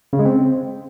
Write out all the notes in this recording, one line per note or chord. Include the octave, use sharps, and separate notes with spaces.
C#3
G#3
C4